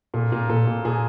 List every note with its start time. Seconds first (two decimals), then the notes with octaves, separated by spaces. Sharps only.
0.14 A#2 A4
0.32 A#2
0.49 A#2 A4
0.67 A#2
0.85 A#2 G#4